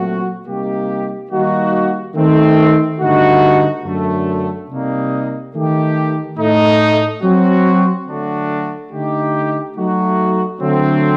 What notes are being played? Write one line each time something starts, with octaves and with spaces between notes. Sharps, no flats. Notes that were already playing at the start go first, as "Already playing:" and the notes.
Already playing: A#2 F#3 A3 C4 F#4
C3 G3 A#3 D#4 G4
D#3 G3 A#3 D#4 F#4
D#3 A3 C4
G2 D3 A3 D#4 F#4
F#2 D3 A3
C3 G3 A#3 D#4
D#3 A3 D#4 G4
A2 A3 D#4
F#3 C4 F#4
D3 F#3 A3 D4 F#4
D3 A3 D#4 G4
F#3 A3 D#4 F#4
D3 F#3 A3 C4